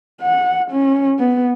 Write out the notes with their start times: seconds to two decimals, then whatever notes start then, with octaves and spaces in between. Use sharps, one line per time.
0.22 F#5
0.71 C#4
1.20 B3